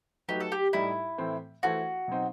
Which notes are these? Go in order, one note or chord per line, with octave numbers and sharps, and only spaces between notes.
F#3 A3 D#4 F#4 G4 B4
A4
G4
A2 G3 D#4 E4
A2 E3 A3 C4
E3 A3 E4 F#4 A4 C5
B2 F#3 C4 D#4